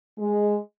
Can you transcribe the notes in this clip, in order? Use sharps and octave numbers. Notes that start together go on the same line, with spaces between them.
G#3